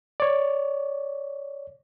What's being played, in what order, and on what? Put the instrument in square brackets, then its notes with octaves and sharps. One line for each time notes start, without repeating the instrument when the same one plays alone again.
[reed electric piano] C#5 D5